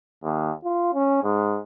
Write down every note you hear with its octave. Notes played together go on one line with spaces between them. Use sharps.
D#2
F4
C#4
G#2